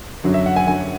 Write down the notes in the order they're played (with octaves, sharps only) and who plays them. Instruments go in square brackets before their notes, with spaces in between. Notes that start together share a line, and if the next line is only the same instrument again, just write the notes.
[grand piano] F#2 D3 F#3
E5
F#5
G#5
F#2 D3 F#3 G#5